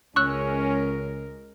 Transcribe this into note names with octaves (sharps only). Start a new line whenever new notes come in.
C#2 G#3 C#4 A#4 C#6 E6 F#6